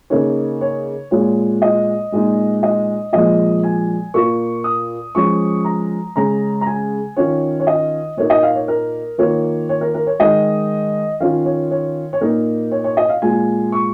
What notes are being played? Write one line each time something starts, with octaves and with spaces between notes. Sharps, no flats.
C#3 A#3 D#4 C#5
C#5
A#2 G#3 F4 C#5
D#5
A#2 G#3 D#4
D#5
A#2 F3 G#3 D#5
G#5
A#2 A#3 F4 C#6
D#6
F3 G#3 C#4 C#6
A#5
C#3 G#3 C#4 A#5
A#5
G#5
D#3 C#4 F4 C#5
C#5
D#5
A#2 A#3 D#4 C#5
D#5
F5
C#5
A#4
D#3 A#3 F4 C#5
C#5
A#4
A#4
C#5
D#3 G#3 D#4 D#5
D#3 C#4 F4 F5
C#5
C#5
C#5
A#2 A#3 D#4 A#4
C#5
C#5
D#5
F5
A#2 G#3 F4 G#5
C#6